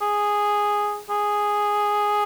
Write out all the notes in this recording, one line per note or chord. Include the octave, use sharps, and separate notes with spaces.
G#4
G#4